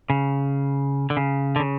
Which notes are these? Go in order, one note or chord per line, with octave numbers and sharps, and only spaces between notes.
C#3
D3
C#3
D3
C#3